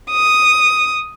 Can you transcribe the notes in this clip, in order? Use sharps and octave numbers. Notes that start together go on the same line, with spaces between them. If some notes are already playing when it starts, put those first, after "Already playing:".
D#6